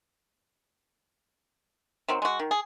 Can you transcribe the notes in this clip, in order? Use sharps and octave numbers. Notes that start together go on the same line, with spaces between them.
D#3 F#3 C4
G#3 F#4
D#3
G#4